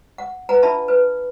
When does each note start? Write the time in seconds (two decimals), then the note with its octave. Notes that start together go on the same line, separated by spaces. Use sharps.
0.18 F#5
0.49 B4 F#5 G#5 A#5
0.63 D4 F4 E5 A5 B5
0.88 B4